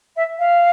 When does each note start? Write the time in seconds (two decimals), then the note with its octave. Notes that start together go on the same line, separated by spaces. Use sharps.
0.16 E5
0.38 F5